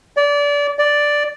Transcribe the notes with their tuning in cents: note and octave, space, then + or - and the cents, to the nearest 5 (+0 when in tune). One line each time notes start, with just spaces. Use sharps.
D5 -25
D5 +0